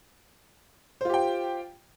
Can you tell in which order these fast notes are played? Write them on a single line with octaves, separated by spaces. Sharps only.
C5 F4 G4 G5